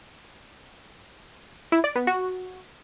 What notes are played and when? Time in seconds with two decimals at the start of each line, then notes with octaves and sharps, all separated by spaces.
1.72 E4
1.84 D5
1.96 B3
2.07 F#4